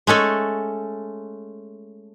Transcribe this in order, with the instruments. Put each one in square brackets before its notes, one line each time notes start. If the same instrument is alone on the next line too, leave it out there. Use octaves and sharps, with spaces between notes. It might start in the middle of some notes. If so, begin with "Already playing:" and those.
[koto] G#3 A3 C#4 A4